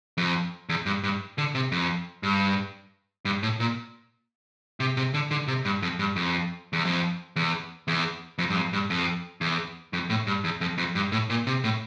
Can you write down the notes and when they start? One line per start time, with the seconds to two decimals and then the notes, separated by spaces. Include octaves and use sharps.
0.17 F2
0.69 E2
0.86 G2
1.03 G2
1.38 D3
1.55 C3
1.72 F2
2.23 G2
3.25 G2
3.43 A2
3.60 A#2
4.80 C3
4.97 C3
5.14 D3
5.31 D3
5.47 C3
5.65 G2
5.82 F2
5.99 G2
6.16 F2
6.73 E2
6.85 F2
7.36 E2
7.88 E2
8.38 F2
8.50 G2
8.56 F2
8.73 G2
8.90 F2
9.41 E2
9.93 F2
10.10 A2
10.27 G2
10.44 E2
10.61 F2
10.78 F2
10.95 G2
11.12 A2
11.30 A#2
11.47 C3
11.64 A2